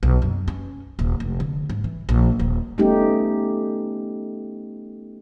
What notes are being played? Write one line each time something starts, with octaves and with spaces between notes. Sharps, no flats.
B1
F#2
C#4
D#1
F1
D3
G#2
E3
A#1
D#1
G3 A3 B3 C#4 D#4 G4